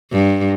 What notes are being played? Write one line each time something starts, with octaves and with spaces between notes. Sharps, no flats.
G2